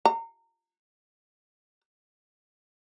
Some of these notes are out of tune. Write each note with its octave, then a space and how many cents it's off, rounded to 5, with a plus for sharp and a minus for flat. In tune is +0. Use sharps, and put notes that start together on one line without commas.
A#5 -25